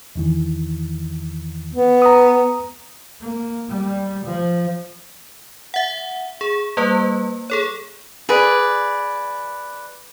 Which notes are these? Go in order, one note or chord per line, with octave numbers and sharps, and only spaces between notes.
E2 D#3 E3
B3
A#5 D#6
A#3
G3
F3
E5 F#5
G#4
G3 A#3 B4
G#4 A4 C#5
G#4 B4 D5